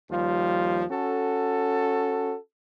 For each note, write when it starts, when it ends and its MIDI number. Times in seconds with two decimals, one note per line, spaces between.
0.10 0.82 39
0.10 0.82 53
0.10 0.82 55
0.10 0.82 65
0.91 2.36 61
0.91 2.36 66
0.91 2.36 69